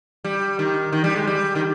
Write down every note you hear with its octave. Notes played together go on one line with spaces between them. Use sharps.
G3
D#3
D#3
G3
G#3
G3
D#3